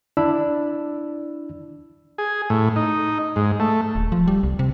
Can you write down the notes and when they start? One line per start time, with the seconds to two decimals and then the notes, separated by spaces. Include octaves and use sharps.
0.17 D4 E4 D5 B5 E6
2.18 G#4
2.50 A2
2.76 D#4
3.36 G#2
3.60 A3
3.96 D#1
4.12 F3
4.28 G3
4.43 C2
4.59 C3